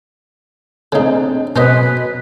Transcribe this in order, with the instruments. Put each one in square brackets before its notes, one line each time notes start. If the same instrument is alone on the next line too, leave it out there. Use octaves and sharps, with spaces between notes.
[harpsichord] C#3 D#4 [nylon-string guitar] C4 D4 G#4
[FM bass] B2 [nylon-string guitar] F#3 [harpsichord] C#4 C5 D#5 [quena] B4